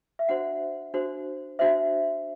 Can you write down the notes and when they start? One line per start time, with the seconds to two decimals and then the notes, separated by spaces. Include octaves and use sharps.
0.19 E5
0.29 D4 F#4 C5 F#5
0.94 D4 F#4 C5
1.59 D4 F#4 C5 E5